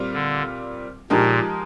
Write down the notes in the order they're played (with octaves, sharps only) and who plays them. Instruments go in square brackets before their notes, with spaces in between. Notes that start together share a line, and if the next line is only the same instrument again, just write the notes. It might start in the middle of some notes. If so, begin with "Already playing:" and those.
Already playing: [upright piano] A#2 G3 C4 F4
[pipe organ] D3
[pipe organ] A#2 [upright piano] F3 G#3 D#4 G4 A#4